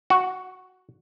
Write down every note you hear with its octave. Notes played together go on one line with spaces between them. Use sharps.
F#4